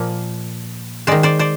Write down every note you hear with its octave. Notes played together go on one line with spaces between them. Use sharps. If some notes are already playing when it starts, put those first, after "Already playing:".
Already playing: A#2 F3 A#3
D#3 G#3 C5 D5
C5 D5
C5 D5